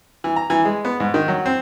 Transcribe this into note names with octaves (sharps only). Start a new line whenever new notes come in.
E3
A#5
E3
G#3
B3
G#2
D#3
F#3
C4